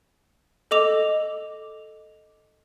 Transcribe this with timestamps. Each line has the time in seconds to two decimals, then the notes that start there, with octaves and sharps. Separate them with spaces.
0.71 A4 D#5 D6 F7